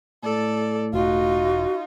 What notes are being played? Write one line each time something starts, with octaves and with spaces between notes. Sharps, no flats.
A2 A4 D5
E1 D#4 F4 F#4